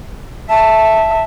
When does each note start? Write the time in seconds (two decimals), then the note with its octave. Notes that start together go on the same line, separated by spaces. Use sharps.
0.49 E5 A5